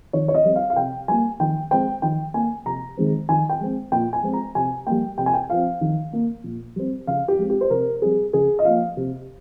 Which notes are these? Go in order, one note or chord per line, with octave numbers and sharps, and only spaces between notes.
D#3 C#5
C#5
D#5
G3 C4
F5
F5
C3 G5
G3 A#3 G#5
D#3 G5
G#3 C4 G5
D#3 G5
A#3 G#5
C3 A#5
D#3 G#3 C4
D#3 G#5
G5
G#3 C4
A#2 G5
G#5
G#3 C4
A#5
C3 G#5
G3 A#3 G5
C3 G5
G#5
G5
F3 C4 F5
D#3
A#3
A#2
G3 C4
C#3 F5
G4
G#3 C4
G4
C5
C3 A#4
G3 C4 G#4
C#3 G#4
D#5
F3 A#3 F5
C3